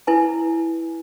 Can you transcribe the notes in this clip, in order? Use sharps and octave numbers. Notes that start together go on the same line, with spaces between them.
E4 B4 G#5